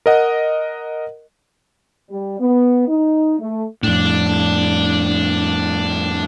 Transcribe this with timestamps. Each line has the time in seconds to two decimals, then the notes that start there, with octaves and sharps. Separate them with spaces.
0.06 A#4 D#5 F#5
2.10 G3
2.40 B3
2.88 D#4
3.39 A3
3.83 F2 A2 D4